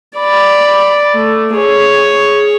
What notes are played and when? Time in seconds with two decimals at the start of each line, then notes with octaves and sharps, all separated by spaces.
0.18 D5 B5
1.15 A3
1.55 G#4 C#5